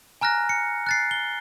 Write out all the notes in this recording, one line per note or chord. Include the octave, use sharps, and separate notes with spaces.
G#5 A#5 F6 F#6 A#6
C#7
F#6 A6 C7
G7